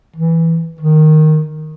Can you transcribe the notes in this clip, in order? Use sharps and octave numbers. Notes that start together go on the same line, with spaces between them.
E3
D#3